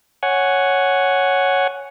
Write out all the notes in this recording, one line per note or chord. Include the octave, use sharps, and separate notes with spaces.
C#5 F#5 G#5